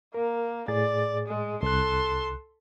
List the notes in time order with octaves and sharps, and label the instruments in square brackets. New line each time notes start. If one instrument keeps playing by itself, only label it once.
[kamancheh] A#3 [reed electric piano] A#4
[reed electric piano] A2 G#4 A6 [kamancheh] D5
[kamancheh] G#3
[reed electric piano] C2 F#6 [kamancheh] A4 C6